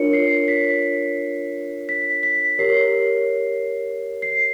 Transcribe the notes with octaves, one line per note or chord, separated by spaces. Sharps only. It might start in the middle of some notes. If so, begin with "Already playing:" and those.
Already playing: D4 F4 A#4 C#5 C#7
C7
B6
B6
B6
G4 A#4 C#5 C7
C7